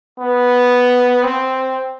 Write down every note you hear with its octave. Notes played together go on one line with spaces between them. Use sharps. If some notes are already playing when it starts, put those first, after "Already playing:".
B3
C4